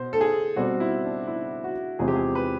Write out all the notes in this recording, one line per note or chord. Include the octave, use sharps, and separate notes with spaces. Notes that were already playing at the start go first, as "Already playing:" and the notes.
Already playing: B2 C5
A4
G#4
B2 G3 C4 F#4
E4
D4
E4
F#4
E2 C3 F3 G#3 C4 G#4
G4
G#4
B4